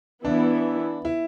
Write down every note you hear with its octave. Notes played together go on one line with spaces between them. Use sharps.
E3 B3 D4 E4
E4